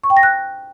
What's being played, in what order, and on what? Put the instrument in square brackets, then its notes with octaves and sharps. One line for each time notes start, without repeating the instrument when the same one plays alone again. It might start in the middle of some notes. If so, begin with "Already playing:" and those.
[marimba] C#6
G5
A#6
F#6